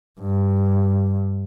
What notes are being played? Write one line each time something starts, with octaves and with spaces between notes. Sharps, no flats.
G2